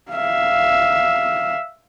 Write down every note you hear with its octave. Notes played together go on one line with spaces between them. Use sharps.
E5 F5